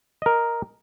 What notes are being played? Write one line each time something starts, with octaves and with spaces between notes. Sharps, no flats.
A#4 D#5